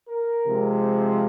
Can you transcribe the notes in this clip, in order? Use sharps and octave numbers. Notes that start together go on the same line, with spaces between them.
A#4
C3 F3 G#3